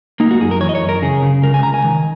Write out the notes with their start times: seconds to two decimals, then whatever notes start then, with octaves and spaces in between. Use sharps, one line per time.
0.20 A#3 D#4
0.31 F#4
0.41 F#2 G#4
0.51 A#4
0.61 E3 C#5
0.69 D#5
0.75 C#5
0.82 F#2
0.89 A#4
1.02 C#3 G#4
1.23 C#3
1.43 C#2 A#4
1.54 G#5
1.63 C#2 A#5
1.74 G#5
1.84 D#3